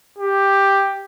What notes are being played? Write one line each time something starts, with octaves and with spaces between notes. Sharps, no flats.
G4